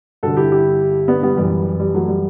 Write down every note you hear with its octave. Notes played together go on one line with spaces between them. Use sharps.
G2 D3 F#4 A4
E4 G4
E4 G4
B3 D4
G3 B3
F#2 E3 G3
G3
F#3 A3
G3